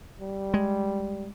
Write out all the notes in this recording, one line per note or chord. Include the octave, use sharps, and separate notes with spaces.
G3
G#3